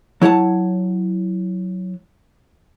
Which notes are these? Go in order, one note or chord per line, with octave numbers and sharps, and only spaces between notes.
F#3 E4 C#5 F#5 A5